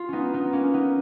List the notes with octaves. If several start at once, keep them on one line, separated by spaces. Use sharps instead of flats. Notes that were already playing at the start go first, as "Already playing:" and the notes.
Already playing: F4
B3 C#4 D#4
B3 D#4
A#3 C#4
B3 D#4